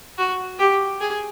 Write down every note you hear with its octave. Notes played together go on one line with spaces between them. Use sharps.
F#4
G4
G#4